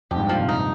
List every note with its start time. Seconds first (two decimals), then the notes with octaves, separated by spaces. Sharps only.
0.11 F2 G4
0.16 G#2
0.19 G2
0.29 A#2 F3
0.40 C3
0.49 D#4